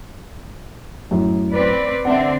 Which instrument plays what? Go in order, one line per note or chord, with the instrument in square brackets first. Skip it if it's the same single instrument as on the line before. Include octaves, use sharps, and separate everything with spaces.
[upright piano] F#2 A2
[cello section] C4 B4 D5
[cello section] D3 C4 D4 [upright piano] E5 F#5